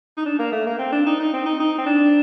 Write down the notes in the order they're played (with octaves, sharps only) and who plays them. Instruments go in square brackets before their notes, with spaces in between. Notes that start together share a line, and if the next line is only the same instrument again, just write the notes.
[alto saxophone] D#4
D4
A#3
A3
A#3
C4
D4
D#4
D#4
C4
D#4
D#4
C4
D4